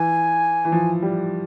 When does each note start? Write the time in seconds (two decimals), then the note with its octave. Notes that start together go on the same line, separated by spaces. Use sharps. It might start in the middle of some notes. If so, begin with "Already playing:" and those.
Already playing: E3 G#5
0.65 E3
0.72 F3
1.02 G3